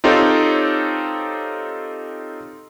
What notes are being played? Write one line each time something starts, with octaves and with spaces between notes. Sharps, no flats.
C4 D#4 F4 G4 A4 C#5